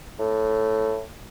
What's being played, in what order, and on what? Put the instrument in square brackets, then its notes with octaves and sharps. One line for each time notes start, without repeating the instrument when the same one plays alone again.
[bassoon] A2